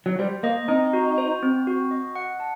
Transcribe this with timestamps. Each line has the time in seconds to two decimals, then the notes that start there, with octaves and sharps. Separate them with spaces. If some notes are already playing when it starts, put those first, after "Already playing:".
0.06 F#3
0.19 G3 C5
0.43 A#3 D#5
0.68 C4 D#4
0.93 F#4
1.18 C5
1.43 C4
1.67 F#4
1.91 D#5
2.15 F#5
2.40 A5